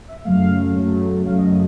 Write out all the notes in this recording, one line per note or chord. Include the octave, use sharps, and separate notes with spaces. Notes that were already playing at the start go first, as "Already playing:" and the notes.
E5
F#2 C#3 F#3 A3 F5
F#2 C#3 F#3 A3
F#2 C#3 F#3 A3 F5
D#5
D#5